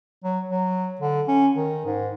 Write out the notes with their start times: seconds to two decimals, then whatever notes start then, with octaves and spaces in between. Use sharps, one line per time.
0.24 F#3
0.49 F#3
1.01 D3
1.28 C#4
1.55 D#3
1.86 G#2